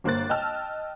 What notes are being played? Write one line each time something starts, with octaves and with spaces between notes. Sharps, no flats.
G1 A#3 C5 F#6 A6
D#5 G5 A5 E6 F6